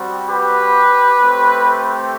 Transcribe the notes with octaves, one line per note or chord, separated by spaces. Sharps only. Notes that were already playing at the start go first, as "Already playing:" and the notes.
Already playing: G3 C4 F#4
G4 B4
A3 C4 G4